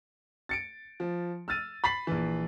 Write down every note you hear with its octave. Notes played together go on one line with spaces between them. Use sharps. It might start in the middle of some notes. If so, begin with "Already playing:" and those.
A6 C#7 D7
F3
E6 F6 A6 D#7
B5 A6 B6 C7 F#7
A#1 E3